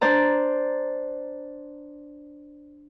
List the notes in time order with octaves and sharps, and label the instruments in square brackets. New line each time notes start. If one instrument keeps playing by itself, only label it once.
[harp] D4 C5 D5 A#5